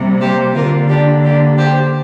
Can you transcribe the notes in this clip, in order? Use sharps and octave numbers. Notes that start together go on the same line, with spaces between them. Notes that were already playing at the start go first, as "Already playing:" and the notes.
Already playing: C3 G3 A#3
G4 C5
D3 A#3 F4 A#4
D4 G4
D4 G4
G4 C5